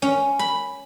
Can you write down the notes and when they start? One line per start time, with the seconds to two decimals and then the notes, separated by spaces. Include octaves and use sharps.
0.02 C#4
0.39 B5